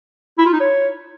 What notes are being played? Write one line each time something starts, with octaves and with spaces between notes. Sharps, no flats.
E4
F4
D#4
C#5